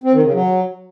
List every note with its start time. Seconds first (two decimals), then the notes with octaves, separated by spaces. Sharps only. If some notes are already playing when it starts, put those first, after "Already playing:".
0.04 C4
0.13 D#3
0.23 C#3
0.33 F#3